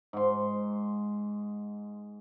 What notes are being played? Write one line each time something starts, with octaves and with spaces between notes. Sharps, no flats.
G#2 C6